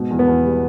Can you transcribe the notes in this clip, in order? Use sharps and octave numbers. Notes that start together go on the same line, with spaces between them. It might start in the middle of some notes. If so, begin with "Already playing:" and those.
Already playing: G#2 B2
E2
B3
E2
G3